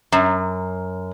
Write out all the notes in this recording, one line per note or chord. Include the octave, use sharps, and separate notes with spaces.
F#2